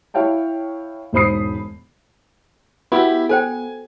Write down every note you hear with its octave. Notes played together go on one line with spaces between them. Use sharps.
E4 C#5 F5 G5 A5
E1 G#2 C5 B5 D#6 C7
B3 E4 F#4 G4 E6
A4 C5 G5 G#5